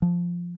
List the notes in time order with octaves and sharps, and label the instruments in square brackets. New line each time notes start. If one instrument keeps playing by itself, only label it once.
[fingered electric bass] F3